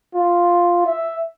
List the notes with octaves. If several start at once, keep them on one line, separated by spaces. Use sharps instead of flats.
F4
E5